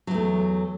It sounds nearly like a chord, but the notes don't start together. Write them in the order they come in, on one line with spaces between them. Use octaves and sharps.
F#3 E2 A3